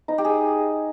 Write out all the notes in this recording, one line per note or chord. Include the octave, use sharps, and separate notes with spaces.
D#4
G4
G#4